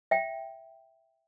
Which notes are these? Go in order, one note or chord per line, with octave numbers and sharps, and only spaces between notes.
E5 G5